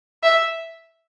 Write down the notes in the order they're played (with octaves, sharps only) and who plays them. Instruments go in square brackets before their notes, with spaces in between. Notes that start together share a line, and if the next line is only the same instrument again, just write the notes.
[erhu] E5